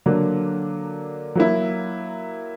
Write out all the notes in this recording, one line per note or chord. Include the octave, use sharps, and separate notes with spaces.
D3 F#3 A#3 D4
F#3 A#3 E4